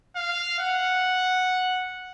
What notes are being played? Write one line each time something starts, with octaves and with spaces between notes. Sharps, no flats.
F5
F#5